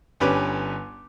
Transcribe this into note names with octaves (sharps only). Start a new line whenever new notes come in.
G1 C#4 D4 G4 B4 D6